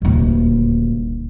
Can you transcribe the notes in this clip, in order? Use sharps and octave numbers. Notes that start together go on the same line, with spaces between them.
D#1 D2